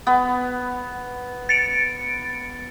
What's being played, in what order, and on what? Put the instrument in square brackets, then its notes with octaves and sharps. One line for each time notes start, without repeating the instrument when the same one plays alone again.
[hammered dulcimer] B3
[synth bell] A6 C#7 D7